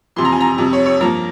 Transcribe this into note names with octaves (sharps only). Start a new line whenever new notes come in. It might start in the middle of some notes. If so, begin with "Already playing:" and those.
F2 C3 E3 C6
A#5
G#5
A#5
F2 C3 G3
C#5
C#5
G2 F3 A#3 A#5